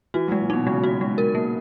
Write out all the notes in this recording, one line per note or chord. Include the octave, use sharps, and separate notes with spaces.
E3 F#4
F#3 G#3
A#2
B2 D#4
C#3 G#3
F#4
G#3
A#4
A#3